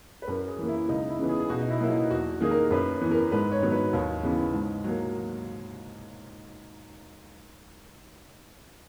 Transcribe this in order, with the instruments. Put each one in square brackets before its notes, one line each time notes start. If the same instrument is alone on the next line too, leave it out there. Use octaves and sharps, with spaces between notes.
[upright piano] B4
F#2 A#4
G#4
E3 A#3
E4
C#2 D#4
E4
C#3 E3 B3
G#4
G#4
B2 F#4
D#4
E4
F#3 A#3 E4
D#4
E2 F#4
D#3 A#3 G#4
A#4
F#2 B4
E3 B3
A#4
G#2 B4
C#5
D#3 F#3 B3
B4
D#2 C#5
C#3 E3 B3
G#2
F#3 A#3